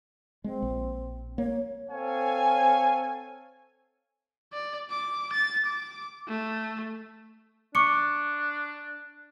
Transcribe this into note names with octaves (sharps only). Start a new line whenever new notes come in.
G#3 C4
A#1
A#3 C#5
C4 A4 C#5 F5 G#5
D5
D6
A6
D6
A3
D4 C#6 D6 C#7